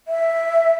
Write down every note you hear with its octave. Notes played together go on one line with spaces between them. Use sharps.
E5